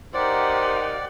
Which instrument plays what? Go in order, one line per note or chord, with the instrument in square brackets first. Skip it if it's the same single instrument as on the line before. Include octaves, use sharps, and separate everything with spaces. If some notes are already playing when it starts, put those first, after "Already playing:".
[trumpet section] D#4 A#4 [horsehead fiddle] G4 F#5 [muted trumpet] C5 [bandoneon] D5